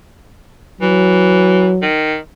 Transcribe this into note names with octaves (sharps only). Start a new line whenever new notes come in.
E3 F#3
D#3